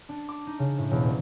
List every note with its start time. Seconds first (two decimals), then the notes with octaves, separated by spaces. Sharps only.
0.09 D4
0.29 D6
0.47 D#4
0.59 C#3
0.79 A2
0.91 E1
1.03 D#1